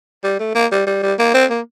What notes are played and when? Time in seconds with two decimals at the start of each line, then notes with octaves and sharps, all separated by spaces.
0.24 G3
0.40 A3
0.55 A#3
0.72 G3
0.87 G3
1.03 G3
1.19 A#3
1.34 C4
1.50 A#3